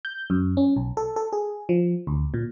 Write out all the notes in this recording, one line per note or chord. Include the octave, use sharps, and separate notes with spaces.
G6
F#2
C#4
B1
A4
A4
G#4
F3
D2
A#2